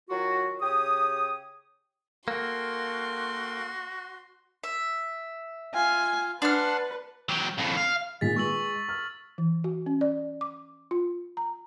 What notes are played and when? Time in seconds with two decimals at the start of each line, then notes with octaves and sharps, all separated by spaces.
0.10 D#3 F#3 F4 F#4
0.61 C#3 G4 C#5 D#6
2.28 A#3 F#4 A4 F5 G5 C6
4.64 E5
5.74 F4 F5 G#5
6.42 D4 B4 F#5 C6 F6
7.29 F#3 G4
7.58 F2 A2
7.77 F5
8.21 A#2 D#3 G#3 A6 B6
8.36 G#3 B4 C#6 E6 F#7
8.89 F6
9.38 E3
9.64 F#4
9.86 C#4
10.01 D5
10.41 D6
10.91 F4
11.37 A#5